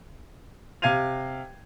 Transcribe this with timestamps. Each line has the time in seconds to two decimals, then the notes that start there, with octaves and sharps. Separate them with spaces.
0.82 C3 F5 G#6 D#7 F7